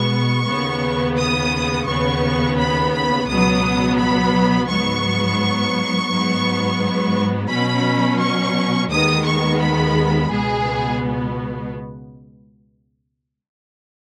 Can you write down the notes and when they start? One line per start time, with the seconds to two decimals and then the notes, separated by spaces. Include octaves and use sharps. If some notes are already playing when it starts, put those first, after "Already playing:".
Already playing: B2 G#3 B3 C#6
0.46 D#2 C#3 B3
1.17 D#6
1.86 D#2 C#3 B3 C#6
2.57 B5
2.93 B5
3.28 C#2 B2 F#3 B3 D#6
3.98 B5
4.68 G#2 F#3 B3 C#6
6.09 G#2 F#3 B3
7.49 B2 F#3 C#4 B5
8.20 C#6
8.90 D#2 D#3 G#3 B3 D#6
9.26 C#6
9.60 B5
10.31 C#2 B2 B3 G#4